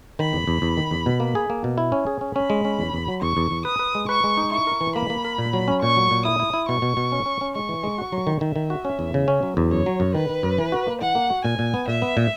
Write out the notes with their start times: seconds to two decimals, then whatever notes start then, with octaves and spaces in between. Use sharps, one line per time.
0.19 D#3 B5
0.33 E2
0.48 E2
0.62 E2
0.77 D#3
0.91 E2
1.06 B2
1.20 A#3
1.35 G#4
1.50 A#3
1.64 B2
1.78 E4
1.92 C#4
2.07 G#4
2.21 C#4
2.36 C#4 B5
2.50 G#3
2.65 C#4
2.79 E2
2.93 E2
3.08 F#3
3.22 E2 C#6
3.37 E2
3.51 E2
3.65 B4 D#6
3.79 B4
3.95 G#3
4.08 B4 C#6
4.24 G#3
4.37 D#4
4.51 E4 C#6
4.67 A#4
4.81 E3
4.95 A#3 B5
5.10 A#3
5.25 A#4
5.38 A#2
5.53 F#3
5.68 C#4
5.82 A#2 C#6
5.97 F#3
6.11 A#2
6.25 E4 D#6
6.40 E4
6.54 E4
6.68 B2 C#6
6.82 B2
6.97 B2
7.12 C#4
7.26 C#4
7.41 C#4
7.55 G#3 C#6
7.69 E3
7.83 G#3
7.98 F#4
8.12 F#3
8.27 D#3
8.41 D#3 E5
8.56 D#3
8.70 F#4
8.85 C#4
8.99 E2
9.14 C#3
9.28 C#4
9.43 F#3
9.57 E2
9.71 F#2 C#5
9.86 F#3
10.00 F#2
10.14 D#3 B4
10.29 D#3
10.43 F#2
10.59 E3
10.72 F#4
10.87 A#3
11.01 E3 F#5
11.15 A#3
11.30 F#4
11.44 A#2 G#5
11.59 A#2
11.74 B3
11.88 A#2 E5
12.02 B3
12.17 A#2